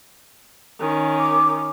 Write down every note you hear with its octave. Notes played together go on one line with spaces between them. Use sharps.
D#3 C#4
D6